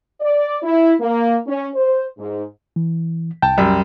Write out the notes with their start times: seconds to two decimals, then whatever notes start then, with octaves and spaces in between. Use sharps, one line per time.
0.20 D5
0.63 E4
1.00 A#3
1.46 C#4
1.74 C5
2.18 G#2
2.76 E3
3.42 C2 G5 A5
3.58 F#2 G3